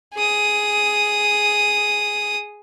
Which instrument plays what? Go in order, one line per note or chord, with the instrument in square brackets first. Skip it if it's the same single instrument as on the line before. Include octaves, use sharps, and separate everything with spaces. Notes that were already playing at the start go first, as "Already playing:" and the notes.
[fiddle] G#4 D#6